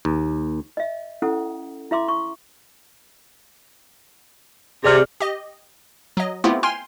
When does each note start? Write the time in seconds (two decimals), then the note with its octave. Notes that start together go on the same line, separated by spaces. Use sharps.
0.05 D#2
0.77 D#5 E5
1.22 C#4 E4 A4 F#5
1.91 E4 E5 C6 D6
2.08 C#6
4.84 C3 G#4 D5 F6
5.20 G4 D#5
6.17 F#3 D#5
6.44 A3 B3 C4 E4 F4 G4
6.63 G5 G#5 C6 F6